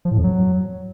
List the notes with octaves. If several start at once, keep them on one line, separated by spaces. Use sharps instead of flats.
F3
A2
F2
F#3